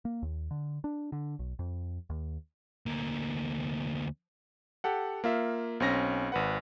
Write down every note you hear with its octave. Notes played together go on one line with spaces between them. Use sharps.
A#3
D#2
D3
D4
D3
B1
F2
D#2
D2 A#3
G4 A4 F#5
A#3 F4 E5
B1 C4 C#4 A#6
G#1 B4 F#5